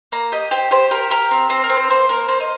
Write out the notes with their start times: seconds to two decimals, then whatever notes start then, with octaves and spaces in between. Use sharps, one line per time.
0.12 A#3 A#5
0.32 G4 D#5
0.51 G4 C5
0.71 G4 C5
0.91 G4 A#4
1.10 G4 A#4
1.31 C4
1.50 C4 C5
1.64 A#4
1.70 C4
1.77 C5
1.90 A#3 C5
2.09 A#3 A#4
2.28 A#3 C5
2.40 D#5